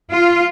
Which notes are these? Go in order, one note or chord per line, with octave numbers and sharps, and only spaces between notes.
F4